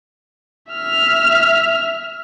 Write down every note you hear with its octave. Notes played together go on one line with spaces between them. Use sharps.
E5 F6